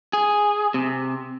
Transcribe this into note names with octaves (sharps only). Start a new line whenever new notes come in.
G#4
C3